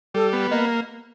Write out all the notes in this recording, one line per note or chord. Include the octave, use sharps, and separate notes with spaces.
G3 A4
B3
A#3 D#5